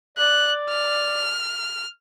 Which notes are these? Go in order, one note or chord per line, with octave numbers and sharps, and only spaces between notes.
D5 F#6
F6